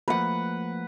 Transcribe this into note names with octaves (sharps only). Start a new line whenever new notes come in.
F3 A3 A#3 B4 F#5